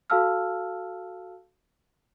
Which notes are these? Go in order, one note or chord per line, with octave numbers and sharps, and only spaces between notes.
F#4 A4 F5 A5 E6 F6